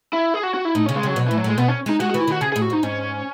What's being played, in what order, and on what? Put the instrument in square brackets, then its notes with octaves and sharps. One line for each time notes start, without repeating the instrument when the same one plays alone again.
[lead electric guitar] E4
G#4
F#4
F#4
E4
[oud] A2 [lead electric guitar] D#4
[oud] C#3 [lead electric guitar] C#4
[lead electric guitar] G#3
[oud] C#3 [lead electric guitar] F#3
[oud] B2
[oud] A2 [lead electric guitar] E3
[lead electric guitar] F#3
[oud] A2 [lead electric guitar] G#3
[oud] B2 [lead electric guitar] B3
[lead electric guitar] C#4
[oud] G#3 [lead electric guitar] D#4
[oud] G#3 [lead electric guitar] F#4
[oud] E3 [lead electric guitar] F#4
[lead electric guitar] E4
[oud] D#3 [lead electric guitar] F#4
[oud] C#3 [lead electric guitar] G#4
[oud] A2 [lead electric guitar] G#4
[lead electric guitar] F#4
[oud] G#2 [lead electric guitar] D#4
[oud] G#2 [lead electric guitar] C#4